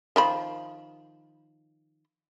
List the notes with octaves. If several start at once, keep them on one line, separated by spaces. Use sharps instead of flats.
D#3 F3 B5